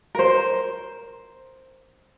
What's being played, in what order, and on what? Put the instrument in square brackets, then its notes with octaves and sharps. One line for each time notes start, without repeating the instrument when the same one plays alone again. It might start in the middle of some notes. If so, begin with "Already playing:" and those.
[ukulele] A#4 C5